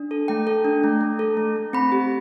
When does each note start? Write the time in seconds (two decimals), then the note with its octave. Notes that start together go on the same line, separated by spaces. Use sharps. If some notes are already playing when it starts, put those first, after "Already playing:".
Already playing: D4
0.11 A4
0.28 A3 G5
0.47 A4
0.65 D4
0.84 A3
1.01 A3
1.19 A4
1.37 A3
1.56 A3
1.73 C4 B5
1.92 G4